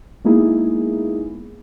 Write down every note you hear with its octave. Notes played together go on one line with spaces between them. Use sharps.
G#3 A#3 B3 D#4 E4 G#4